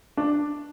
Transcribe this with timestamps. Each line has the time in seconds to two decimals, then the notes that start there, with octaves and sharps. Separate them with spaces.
0.17 D4